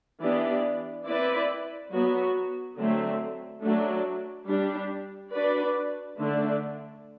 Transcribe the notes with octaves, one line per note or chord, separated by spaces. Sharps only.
E3 B3 D4 G4 D5
C4 E4 B4 D5
F#3 B3 F#4
D3 F#3 A3 C4
F#3 A3 D4 F#4
G3 D4 G4
D4 F#4 B4 D5
D3 A3 D4